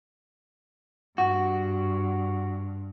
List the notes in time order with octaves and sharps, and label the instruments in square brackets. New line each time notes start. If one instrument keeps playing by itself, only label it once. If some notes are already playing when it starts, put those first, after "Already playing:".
[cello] G2 [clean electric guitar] F#4